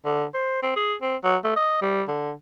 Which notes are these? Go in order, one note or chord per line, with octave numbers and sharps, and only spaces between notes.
D3
C5
C4
G#4
C4
F#3
A3
D#5
G3
D3